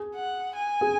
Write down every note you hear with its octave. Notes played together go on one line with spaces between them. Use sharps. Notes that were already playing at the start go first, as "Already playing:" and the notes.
Already playing: G#4
F#5
G#5
G#4